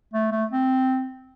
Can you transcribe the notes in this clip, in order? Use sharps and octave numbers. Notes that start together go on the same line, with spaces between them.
A3
A3
C4